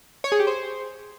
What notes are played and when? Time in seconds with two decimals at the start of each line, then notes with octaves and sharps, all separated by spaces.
0.24 C#5
0.32 G#4
0.39 G4
0.47 C5